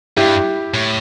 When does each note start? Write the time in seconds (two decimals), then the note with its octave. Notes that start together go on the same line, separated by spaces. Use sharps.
0.17 G2 E4 G4
0.74 A2